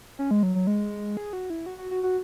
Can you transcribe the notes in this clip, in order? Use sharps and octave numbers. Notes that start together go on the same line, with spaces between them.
C#4
G#3
F#3
F#3
G#3
G#4
F#4
E4
F#4
F#4
F#4
F#4